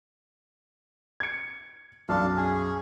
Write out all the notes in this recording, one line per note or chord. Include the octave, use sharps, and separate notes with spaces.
G#6 C#7
B1 F#2 D4 A4 F5
C#4 G#4